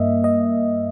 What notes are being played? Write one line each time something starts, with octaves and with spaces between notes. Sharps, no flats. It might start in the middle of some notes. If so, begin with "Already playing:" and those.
Already playing: G2 A#3 D#5 E5
D#5